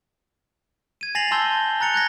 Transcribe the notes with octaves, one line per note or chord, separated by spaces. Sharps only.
G#6 D#7
G#5 A6 A#6 C7 F7 F#7
G#5 A5 C6 E6 G6 G7
A#5 F#6 A6 C#7 F7 G7
F#6 G#6 A#6